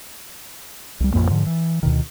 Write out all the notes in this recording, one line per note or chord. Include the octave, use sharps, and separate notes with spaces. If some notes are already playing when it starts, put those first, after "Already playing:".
C2 G3
A1 F2 A2 A#3
G#2 D3 F3
E3
D2 B2 D#3